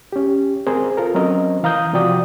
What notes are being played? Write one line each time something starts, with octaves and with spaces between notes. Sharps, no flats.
C#4 G4
C4 G#4 A#4 C5
F4 A4 A#4
F#3 C4 C#4 A#4 D#5
E3 F5 A#5 D#6 G6
C3 F3 F#4 D5 G5 D#6